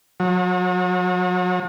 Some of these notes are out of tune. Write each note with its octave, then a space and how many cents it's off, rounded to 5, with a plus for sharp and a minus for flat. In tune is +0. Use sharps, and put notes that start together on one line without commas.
F#3 -35